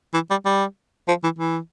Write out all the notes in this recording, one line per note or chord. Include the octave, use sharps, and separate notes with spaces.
E3
G3
G3
F3
E3
E3